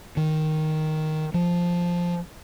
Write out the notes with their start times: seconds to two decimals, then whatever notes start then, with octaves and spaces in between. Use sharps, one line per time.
0.17 D#3
1.34 F3